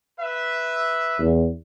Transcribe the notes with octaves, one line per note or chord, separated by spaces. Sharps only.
B4 E5
E2